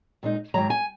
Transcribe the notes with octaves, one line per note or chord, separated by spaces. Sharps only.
A#2 G#3 D#4
G#2 D#3 F#3 A#5
G#5